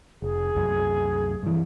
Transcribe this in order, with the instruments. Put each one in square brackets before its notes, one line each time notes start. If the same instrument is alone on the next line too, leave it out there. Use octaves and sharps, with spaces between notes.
[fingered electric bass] F1 [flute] G#4
[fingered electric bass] C2 F#2 F#3
G2 E3